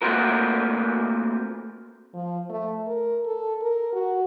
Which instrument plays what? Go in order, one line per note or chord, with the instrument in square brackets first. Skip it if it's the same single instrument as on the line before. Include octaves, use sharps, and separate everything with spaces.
[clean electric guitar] A3 A#3 C4 F4 F#4 A#4
[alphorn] F3
A3
A#4
A4
A#4
F#4